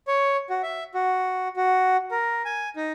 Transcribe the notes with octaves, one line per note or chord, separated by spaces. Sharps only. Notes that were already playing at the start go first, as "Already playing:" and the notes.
C#5
F#4
E5
F#4
F#4
A#4
G#5
D#4